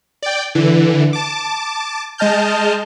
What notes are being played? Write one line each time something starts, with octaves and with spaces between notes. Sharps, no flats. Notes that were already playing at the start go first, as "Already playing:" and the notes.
D5 G5
D3 E3
A5 D6
G#3 D#5 A5 F6 G6